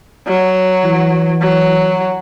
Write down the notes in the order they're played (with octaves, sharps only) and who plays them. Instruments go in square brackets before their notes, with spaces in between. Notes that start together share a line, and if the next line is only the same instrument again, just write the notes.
[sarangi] F#3
[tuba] E3
[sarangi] F#3